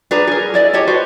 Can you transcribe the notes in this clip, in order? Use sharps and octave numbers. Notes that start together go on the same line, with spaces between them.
D4 G#4 B4 A#5
G#4 A#4
E4 D5 D#5
G4 C#5 D#5 A5
F#4 B4 C5